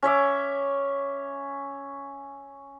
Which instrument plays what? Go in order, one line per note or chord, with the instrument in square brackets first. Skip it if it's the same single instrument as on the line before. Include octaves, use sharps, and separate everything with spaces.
[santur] C#4 C#5 E5 D6